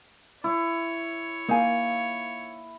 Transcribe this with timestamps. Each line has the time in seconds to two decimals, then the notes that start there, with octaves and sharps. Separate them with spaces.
0.44 E4 C#5
1.49 A#3 D#4 F5 G#5